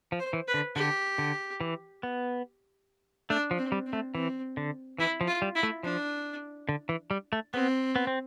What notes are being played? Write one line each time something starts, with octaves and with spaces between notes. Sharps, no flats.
F3
C5
E3
B4
D3
D3 G4
D3
E3
B3
A3 D4
F3
C4
G3
C4
A3
E3 C4
D3
E3 E4
F3
F4
G3
E4
A3
F3 D4
D3
E3
G3
A3
B3 C4
B3
C4